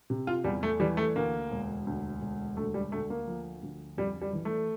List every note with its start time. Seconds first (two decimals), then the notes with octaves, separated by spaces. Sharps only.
0.10 C3
0.27 F4
0.44 E2 G3
0.63 A3
0.80 E3 G3
0.97 A3
1.16 D2 A#3
1.51 E1
1.87 D2
2.21 E1
2.57 D2 A3
2.74 G3
2.92 D2 A3
3.10 A#3
3.27 F3
3.63 D2
3.97 F2 G3
4.21 G3
4.33 E3
4.45 A3